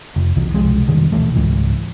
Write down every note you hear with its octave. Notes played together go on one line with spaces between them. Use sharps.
F1
B1 E3
C2 F3 G#3
F1 G2 B2 D#3
D1 A#1 E3 A3
C#2 G#2 E3